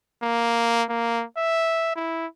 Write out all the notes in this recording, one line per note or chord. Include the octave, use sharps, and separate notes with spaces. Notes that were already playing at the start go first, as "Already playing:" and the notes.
A#3
A#3
E5
E4